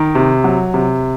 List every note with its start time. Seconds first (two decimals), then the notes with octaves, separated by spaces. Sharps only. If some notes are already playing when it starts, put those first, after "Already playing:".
Already playing: D#3
0.15 C3
0.44 F#3
0.74 C3